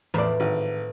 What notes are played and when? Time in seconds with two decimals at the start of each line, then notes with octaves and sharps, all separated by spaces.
0.14 E2 A2 E3 F3 D5
0.40 G#1